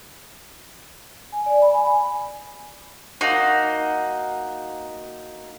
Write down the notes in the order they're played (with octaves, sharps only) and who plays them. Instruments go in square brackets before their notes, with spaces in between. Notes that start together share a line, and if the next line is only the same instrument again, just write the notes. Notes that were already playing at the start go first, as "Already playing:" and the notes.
[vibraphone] G#5
D5
B5
G#5
[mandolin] A#3 D#4 F#4